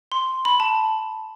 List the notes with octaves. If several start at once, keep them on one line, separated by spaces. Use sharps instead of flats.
C6
B5
A5